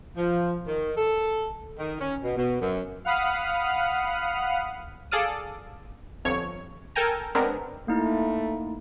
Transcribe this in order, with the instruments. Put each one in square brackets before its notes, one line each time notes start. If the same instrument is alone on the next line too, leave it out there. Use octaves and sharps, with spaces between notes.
[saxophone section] F3
D#3
A4
D#3
C#4
B2
B2
F#2
[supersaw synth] F5 F#5 B5 D#6 F6
[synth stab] G#4 A4 D5 F5 D#6
G1 F2 C#5
A4 A#4 G5 G#5 A#5
G#3 B3 C4 D4 A#4
[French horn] A3 [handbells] A#3 D#4 E4